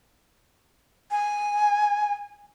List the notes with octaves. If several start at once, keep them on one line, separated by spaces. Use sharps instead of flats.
G#5